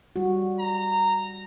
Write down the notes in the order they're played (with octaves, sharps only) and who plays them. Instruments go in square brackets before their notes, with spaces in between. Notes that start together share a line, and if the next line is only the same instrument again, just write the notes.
[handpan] G3 F#4
[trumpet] A#5